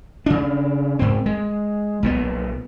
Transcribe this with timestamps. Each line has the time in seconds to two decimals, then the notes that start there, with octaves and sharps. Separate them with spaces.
0.26 C#3 D4
0.99 G#2 C4
1.26 G#3
2.03 B1 A#2 B3